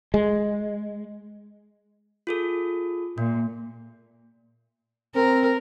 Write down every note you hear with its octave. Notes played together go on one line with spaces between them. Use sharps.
G#3
F4 G#4 A4
A#2 A#3
C4 A#4